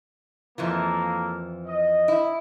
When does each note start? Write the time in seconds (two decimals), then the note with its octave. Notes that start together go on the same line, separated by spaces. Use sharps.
0.58 F2 E3 F3 A#3 A4 A#4
1.67 D#5
2.08 E4